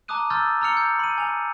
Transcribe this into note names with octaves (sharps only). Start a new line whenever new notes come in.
A5 A#5 D6 D#6 F#6 D#7
A#5 C6 E6 F6 G6 A6
A#5 C6 E6 F6 C#7 F7
G6
B5 D#7
G#5 F7